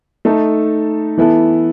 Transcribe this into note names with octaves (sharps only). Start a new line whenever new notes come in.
A3 D#4 A4
E3 B3 E4 A4